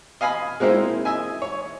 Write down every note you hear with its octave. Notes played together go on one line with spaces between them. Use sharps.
D#5 F5 G#5 B5 D#6
G#3 A#3 C4 D#4 E4
D#5 E5 G#5
C#5